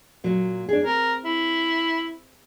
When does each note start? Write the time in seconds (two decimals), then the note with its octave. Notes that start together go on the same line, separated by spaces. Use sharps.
0.24 A#2 F#3
0.69 D4 G#4
0.84 C4 A#4
1.24 E4